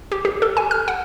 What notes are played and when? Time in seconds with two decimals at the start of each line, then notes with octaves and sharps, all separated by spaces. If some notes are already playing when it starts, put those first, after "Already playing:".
0.12 G4
0.25 G4
0.42 A4
0.57 G#5
0.71 F6
0.88 F#5